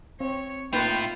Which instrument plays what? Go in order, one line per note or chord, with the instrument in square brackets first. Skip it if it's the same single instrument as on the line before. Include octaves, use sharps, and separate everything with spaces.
[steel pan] C4 [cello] C#5
[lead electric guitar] A2 [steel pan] A#3 D#4 B4 [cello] F4 [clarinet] G5